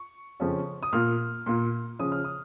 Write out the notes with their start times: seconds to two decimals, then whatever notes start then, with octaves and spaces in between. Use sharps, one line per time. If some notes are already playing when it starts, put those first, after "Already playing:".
Already playing: C#6
0.40 F2 C#3 F3 C#4 F4
0.83 D#6
0.93 A#2 A#3 F4 F6
1.46 A#2 A#3 F4
1.99 C#3 F3 C#4 F4 D#6
2.12 F6
2.24 D#6